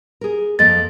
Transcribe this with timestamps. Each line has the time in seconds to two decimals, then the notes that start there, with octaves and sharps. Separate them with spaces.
0.21 G#4 A#4
0.59 F2 A#3 D#5 A6